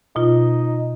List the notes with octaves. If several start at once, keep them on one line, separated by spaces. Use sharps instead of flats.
B2 D#4 F4